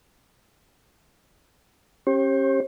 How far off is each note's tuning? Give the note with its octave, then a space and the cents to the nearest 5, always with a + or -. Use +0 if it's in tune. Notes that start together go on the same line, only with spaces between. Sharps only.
C#4 -30 G4 +0 C5 +45